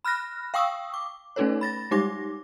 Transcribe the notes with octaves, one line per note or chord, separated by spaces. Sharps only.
B5 F6 F#6 A#6
F5 G5 C#6 D#6 E6
D6
A3 C#4 D#4 A4 B4 C#5
B5 A6 A#6
G3 G#3 D#4 G4 D6 A#6